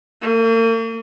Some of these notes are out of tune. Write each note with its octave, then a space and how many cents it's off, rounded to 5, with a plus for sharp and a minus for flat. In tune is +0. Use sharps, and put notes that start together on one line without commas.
A#3 -45